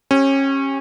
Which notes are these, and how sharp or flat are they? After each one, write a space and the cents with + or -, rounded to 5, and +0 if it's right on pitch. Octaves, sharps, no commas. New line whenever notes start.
C#4 -25 G4 +0